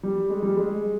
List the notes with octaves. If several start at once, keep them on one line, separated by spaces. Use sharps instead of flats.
G3
G#3
G3
G#3